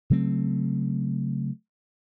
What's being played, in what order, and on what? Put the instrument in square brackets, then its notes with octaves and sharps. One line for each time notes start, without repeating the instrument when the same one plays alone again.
[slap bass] C#3 F#3 A3 C4